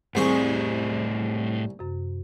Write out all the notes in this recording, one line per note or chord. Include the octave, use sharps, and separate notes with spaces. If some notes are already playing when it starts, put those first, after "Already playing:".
C2 A2 C4 G#4 C5 C#6
F#2 C3